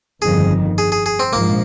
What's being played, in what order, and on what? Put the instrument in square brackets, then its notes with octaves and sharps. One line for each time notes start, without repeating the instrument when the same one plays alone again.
[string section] G1 F2 D#3 [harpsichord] G#4
[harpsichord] G#4
G#4
G#4
C4
[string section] A#1 G#2 F3 [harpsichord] A#3